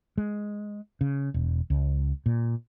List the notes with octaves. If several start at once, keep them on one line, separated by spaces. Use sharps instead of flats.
G#3
C#3
E1
C#2
A#2